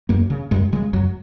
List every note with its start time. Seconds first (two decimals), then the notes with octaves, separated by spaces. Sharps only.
0.09 F#2 A#3
0.30 C#3
0.51 F#2 G#3
0.73 C#3 G#3
0.93 F#2 F#3